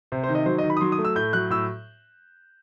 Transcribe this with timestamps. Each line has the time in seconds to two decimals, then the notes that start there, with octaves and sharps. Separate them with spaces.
0.12 C3 C5
0.24 C5
0.29 D#3
0.35 D#5
0.46 F#3 C5
0.58 D#5
0.63 D#3
0.70 B5
0.77 D#6
0.81 F#3 C6
0.92 D#6
0.98 A3
1.05 E6
1.15 A2 G6
1.33 F#3 F#6
1.50 A2 E6